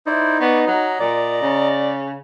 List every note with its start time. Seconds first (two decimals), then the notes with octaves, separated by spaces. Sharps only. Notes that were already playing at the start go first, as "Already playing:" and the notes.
0.07 D#4 E4 C5 D5
0.41 B3 D5 D#5 C#6
0.67 F#3 D#5 A#5
1.00 A#2 D5
1.42 C#3